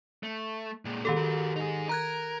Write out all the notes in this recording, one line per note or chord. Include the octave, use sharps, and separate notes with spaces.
A3
A#2 G#3
D#3 G4 A4
F#4 A#4
D#4 G#4
A#4 A#5 F#6 G#6